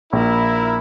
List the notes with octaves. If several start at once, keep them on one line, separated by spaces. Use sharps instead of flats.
A#1 E4 A#4